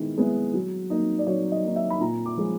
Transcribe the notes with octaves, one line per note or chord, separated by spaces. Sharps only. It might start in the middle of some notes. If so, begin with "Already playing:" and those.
Already playing: D#3 G#3 B3 E4
G#3 B3 E4
F#3
A#3 D#4
D5
F#3 C#5
D#5
A#3 D#4
E5
B5
A#2 A#5
D6
F3 G#3